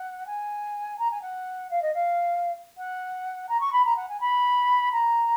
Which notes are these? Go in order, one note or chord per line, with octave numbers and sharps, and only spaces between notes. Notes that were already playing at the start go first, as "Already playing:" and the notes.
Already playing: F#5
G#5
A#5
G#5
F#5
F5
D#5
F5
F#5
A#5
C#6
B5
A#5
F#5
G#5
B5
A#5